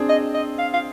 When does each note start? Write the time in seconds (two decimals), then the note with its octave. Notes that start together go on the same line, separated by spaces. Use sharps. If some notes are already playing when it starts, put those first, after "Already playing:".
Already playing: C4 D4 G#4
0.09 D#5
0.34 D#5
0.59 F5
0.74 F5